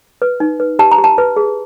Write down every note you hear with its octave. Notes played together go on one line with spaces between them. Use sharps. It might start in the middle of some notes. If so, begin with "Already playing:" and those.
B4
D#4
B4
G4 A5
A#5
G4
A5
B4
G#4